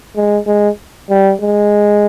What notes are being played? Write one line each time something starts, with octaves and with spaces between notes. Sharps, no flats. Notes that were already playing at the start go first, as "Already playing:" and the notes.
G#3
G#3
G3
G#3